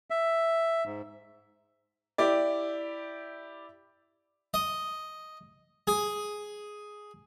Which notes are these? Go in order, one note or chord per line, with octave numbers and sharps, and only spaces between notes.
E5
G#2
E4 G4 D5
D#5
G#4